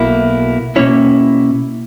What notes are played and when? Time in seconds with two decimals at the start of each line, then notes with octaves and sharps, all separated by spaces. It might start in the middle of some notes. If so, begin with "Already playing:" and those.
Already playing: B1 B2 A#3 E4
0.76 B2 A#3 C#4 E4 C#5